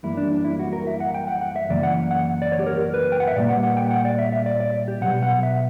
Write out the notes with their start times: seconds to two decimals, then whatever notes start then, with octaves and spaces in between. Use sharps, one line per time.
0.03 F#2 E3 G3 A#3 E4
0.17 D4
0.32 D4
0.45 E4
0.59 F#4
0.73 A#4
0.87 E5
1.00 F#5
1.14 G5
1.28 F#5
1.41 F#5
1.56 E5
1.69 F#2 C#3 E3 A#3 D5
1.83 F#5
2.11 F#5
2.42 D5
2.52 C#5
2.59 G4
2.66 A#4
2.80 A#4
2.94 B4
3.12 G5
3.20 F#5
3.28 E5
3.35 A#2 G3 A#3 D5
3.49 F#5
3.63 F#5
3.77 G5
3.91 F#5
4.05 D5
4.19 E5
4.33 E5
4.46 D5
4.60 D5
4.88 G4
5.01 B2 F#3 B3 F#5
5.23 F#5
5.43 E5